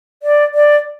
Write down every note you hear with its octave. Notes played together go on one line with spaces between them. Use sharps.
D5
D5